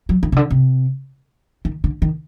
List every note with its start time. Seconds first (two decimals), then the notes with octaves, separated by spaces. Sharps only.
0.09 F#3
0.23 D#3
0.32 C3
0.36 D3
0.50 C3
1.65 D#3
1.84 D3
2.02 D#3